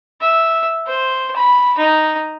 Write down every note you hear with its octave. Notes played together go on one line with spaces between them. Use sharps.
E5
C5
B5
D#4